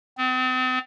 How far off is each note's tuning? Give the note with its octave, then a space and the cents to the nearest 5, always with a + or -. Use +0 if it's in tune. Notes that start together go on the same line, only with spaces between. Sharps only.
C4 -40